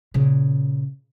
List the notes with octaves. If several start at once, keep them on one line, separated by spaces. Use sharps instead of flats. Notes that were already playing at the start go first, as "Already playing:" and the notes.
A#2 C#3